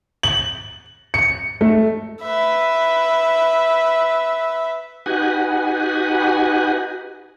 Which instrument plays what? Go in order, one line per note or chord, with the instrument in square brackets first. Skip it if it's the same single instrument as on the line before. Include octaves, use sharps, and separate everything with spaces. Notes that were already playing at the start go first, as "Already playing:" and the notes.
[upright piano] F#7
C#7
A3
[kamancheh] B4 E5
[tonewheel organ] D#4 F#4 G4 B4 F#5 G#5